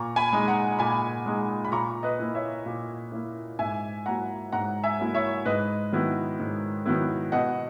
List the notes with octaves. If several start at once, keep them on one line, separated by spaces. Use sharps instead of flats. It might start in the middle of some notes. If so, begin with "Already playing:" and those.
Already playing: A#2 A#5 C#6
G#5 B5
G#3 D#4
F#5 A#5
A#2 G#5 B5
G#3 D#4
B5
A#2 A#5 C#6
B4 D#5
A#3 E4
C#5 E5
A#2
A#3 E4
G#2 E5 G#5
F#3 A#3 E4 F#5 A#5
G#2 F#5 A#5
E5 G#5
F#3 A#3 E4
C#5 E5
G#2 B4 D#5
D#3 F#3 B3 E4
G#2
D#3 F#3 B3 E4
B2 D#5 F#5